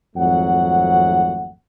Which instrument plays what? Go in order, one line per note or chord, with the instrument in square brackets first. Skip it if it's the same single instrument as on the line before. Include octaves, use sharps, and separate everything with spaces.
[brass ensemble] G#1 F2 F#3 A3 F#5